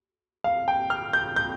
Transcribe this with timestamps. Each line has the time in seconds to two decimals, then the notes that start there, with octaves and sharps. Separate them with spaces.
0.44 F5
0.68 G5
0.90 F6
1.13 G6
1.36 G6